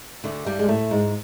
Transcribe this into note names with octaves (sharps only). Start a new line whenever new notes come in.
D2 D3
G2 G3
G#3
A2 A3
G#2 G#3